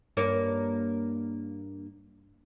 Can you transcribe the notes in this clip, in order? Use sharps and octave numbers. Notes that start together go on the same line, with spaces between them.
G2 A#3 C#5